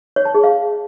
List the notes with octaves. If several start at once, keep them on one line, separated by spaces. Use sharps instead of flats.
C#5
A5
G#4
F5